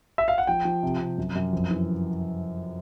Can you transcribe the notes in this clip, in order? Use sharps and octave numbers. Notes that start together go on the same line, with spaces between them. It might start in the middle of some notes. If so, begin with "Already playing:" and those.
E5
F5
F#5
F3 G5
F3
C3
C3
F#2
F#2
F2
E3